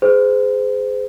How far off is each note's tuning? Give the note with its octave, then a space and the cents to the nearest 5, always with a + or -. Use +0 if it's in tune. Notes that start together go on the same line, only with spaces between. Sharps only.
G#4 +5 C5 -35